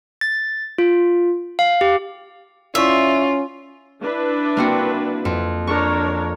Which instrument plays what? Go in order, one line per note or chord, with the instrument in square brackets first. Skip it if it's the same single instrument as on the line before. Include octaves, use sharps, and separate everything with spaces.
[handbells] A6
F4
F5
G4
[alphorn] C#4 [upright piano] E4 D5 C#6 [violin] F4 [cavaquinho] E5
[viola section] D4 E4 B4
[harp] A#3 C4 F#4
F2
[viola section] D4 A#4 C#5 [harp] C#6